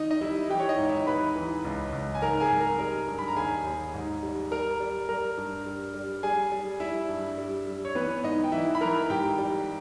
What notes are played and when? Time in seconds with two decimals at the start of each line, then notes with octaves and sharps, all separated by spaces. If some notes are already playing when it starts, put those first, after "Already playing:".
Already playing: D#3 D#4 D#5
0.11 D#5
0.21 G3 E4 E5
0.50 E3 G4 G5
0.59 C#5
0.69 D#4 D#5
0.79 G#2
0.88 E4 E5
1.07 D#2 B4 B5
1.36 E3
1.65 C#2
1.93 C#2
2.15 G#5
2.22 G#2 A#4 A#5
2.40 G#4 G#5
2.50 G#2
2.60 A#4 A#5
2.79 G3 A#4 A#5
3.07 G2
3.19 B5
3.28 A#5
3.36 D#2 G#4 G#5
3.65 D#2
3.94 G#2
4.23 G3
4.51 G3 A#4 A#5
4.80 G3
5.08 G3 A#4 A#5
5.37 G2
5.66 G3
5.94 G3
6.23 G3 G#4 G#5
6.52 G3
6.80 G3 E4 E5
7.09 G2
7.38 G3
7.67 G3
7.85 C#5
7.95 E3 B3 B4
8.23 G#2 D#4 D#5
8.43 G5
8.52 E3 E4 E5
8.75 B5
8.81 E3 A#4 A#5
9.10 G#2 G4 G5
9.38 G3